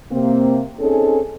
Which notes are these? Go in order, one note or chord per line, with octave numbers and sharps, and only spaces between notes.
C3 A#3 C4
C4 C#4 D#4 G#4 A4